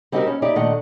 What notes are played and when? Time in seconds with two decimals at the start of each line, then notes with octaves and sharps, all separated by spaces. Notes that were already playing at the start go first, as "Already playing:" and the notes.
0.12 G3 C4 D#4 F#4 G4 A#4
0.27 C#4
0.42 D#4 E4 G4 D5
0.56 A#2 D#3 A3 D4 D#5 F#5